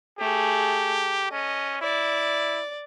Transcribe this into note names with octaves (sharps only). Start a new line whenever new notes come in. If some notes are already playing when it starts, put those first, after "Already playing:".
A3 G4 G#4
C#4 D#5
E4 D5